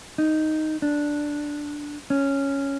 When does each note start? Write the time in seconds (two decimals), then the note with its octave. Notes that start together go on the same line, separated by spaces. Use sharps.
0.18 D#4
0.82 D4
2.10 C#4